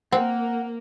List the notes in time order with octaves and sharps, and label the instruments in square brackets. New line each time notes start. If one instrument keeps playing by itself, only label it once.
[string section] A#3 [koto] C4 [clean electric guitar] F#5